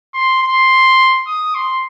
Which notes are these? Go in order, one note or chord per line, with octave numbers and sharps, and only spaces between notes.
C6
C6
D#6
C6